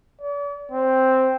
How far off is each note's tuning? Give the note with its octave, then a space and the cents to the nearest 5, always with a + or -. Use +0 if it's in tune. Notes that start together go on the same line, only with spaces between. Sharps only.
D5 -45
C4 +0